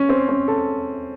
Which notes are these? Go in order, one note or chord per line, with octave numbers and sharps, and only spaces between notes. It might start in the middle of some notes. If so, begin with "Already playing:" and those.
Already playing: C#4
C4
C#4
A4